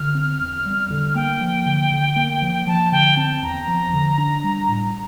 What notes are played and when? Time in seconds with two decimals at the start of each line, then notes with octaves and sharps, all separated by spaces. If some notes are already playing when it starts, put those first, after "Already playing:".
Already playing: D3 F6
0.15 C4
0.40 E2
0.66 G3
0.91 D3
1.15 A#3 G5
1.41 F3
1.66 D3
1.92 D3
2.16 A#3
2.42 F3
2.67 F3 A5
2.92 D3 G5
3.17 C4 A5
3.42 E2 A#5
3.67 F3
3.93 D3
4.18 D4
4.44 G3
4.68 A2